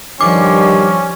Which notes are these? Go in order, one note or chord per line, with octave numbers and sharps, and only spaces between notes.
G2 D#3 F3 G3 C#4 D6